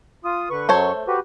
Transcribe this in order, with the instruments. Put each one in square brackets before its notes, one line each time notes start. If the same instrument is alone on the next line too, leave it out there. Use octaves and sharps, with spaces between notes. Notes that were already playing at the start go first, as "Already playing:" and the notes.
[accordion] F4 D#6
D3 B4 C#6
[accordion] F#2 F#3 C#6 [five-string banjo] A4 C5 C#5
[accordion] A3
F#4 G4 B4